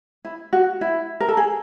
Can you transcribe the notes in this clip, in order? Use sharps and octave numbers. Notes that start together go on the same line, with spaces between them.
E4
F#4
E4
A#4
A4
G#4